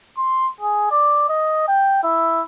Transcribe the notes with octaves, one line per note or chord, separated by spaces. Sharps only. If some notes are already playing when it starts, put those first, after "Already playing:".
C6
G#4
D5
D#5
G5
E4